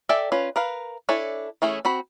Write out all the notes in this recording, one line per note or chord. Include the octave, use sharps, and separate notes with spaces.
A4 D5 E5 G5 G#5
C#4 F4 B4
A#4 B4 F5
D4 E4 A4 C#5 G#5
E3 A3 C#4 G#4
C4 F#4 B5